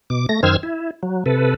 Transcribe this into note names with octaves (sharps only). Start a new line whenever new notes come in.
B2 D6
A3 A#6
F#2 D#3 C5 E6 F6 G#6
E4
F#3
C3 A4 B4